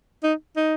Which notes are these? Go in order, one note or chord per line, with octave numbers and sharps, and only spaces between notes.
D#4
D#4